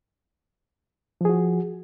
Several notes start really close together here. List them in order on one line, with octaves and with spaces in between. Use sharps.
F3 G#4 F#4